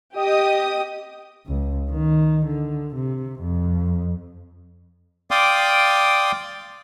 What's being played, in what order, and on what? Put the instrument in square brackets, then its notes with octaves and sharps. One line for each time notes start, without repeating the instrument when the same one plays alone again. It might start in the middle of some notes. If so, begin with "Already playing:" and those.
[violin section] G4 D#6 [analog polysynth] D#5
[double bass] C#2
D#3
D3
C3
F2
[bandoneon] D5 F5 G5 C6 D6 D#6